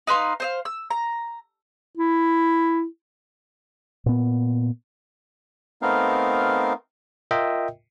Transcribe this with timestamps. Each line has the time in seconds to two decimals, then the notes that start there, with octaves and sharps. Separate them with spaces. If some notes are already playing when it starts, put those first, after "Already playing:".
0.07 D#4 B4 F5 C6
0.40 C5 D#5 F5
0.65 E6
0.91 A#5
1.98 E4
4.06 A#2 B3
5.82 A3 B3 C4 D#4 A#4 F5
7.31 F4 A#4 D#5 E5 G5